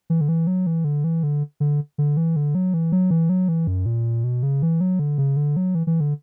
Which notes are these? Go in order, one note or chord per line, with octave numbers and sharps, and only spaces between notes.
E3
D3
E3
F#3
E3
D3
E3
D3
D3
D3
E3
D3
F#3
E3
F#3
E3
F#3
E3
F#2
A#2
B2
C#3
E3
F#3
D3
C#3
D3
F#3
E3
E3
D3